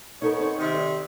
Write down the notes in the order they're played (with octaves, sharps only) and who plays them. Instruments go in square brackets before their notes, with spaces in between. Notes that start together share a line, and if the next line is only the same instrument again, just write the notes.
[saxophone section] B3 C#5 [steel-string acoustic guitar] D#4 A4 A#4
[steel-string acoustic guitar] C4 D#4 G#4
[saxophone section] C3 D#3
[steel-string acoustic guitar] D5